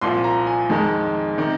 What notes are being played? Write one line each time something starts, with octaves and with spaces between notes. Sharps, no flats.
C2 A#2 F3 C6
A#5
G#5
F2 D#3 G#3
C3 D#3